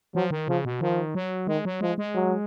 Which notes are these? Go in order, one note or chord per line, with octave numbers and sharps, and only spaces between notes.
F3 F#3
D#3
C#3 F3
B2
D#3 F3
F#3
D#3 G#3
F#3
F3 G#3
G#3
F#3